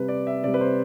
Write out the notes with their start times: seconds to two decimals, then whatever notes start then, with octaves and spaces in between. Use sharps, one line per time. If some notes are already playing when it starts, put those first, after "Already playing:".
Already playing: C3 G3 B4
0.08 D5
0.27 E5
0.43 C3 D5
0.46 G3
0.54 B4
0.61 C5